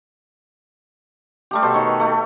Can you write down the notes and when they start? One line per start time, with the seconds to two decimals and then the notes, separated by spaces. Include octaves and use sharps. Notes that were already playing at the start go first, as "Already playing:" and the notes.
1.51 G3 A3 G4
1.62 B2 A4 C5
1.74 D#3 C#5
1.87 B4
2.00 A3